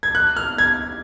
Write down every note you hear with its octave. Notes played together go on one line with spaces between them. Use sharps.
G#6
F#6
F6
G#6